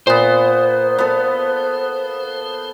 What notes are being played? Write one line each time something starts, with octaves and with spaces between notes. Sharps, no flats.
A#2 B3 C5
B3 A4